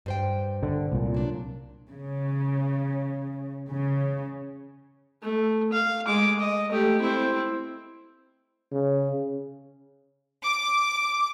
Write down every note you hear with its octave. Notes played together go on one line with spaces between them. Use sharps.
G2 C5 G5
D3
C2 A#2
F#3 D4
C#3
C#3
A3
F5
G#3 D6
D#5
A3 G4
C4 E4
C#3
D6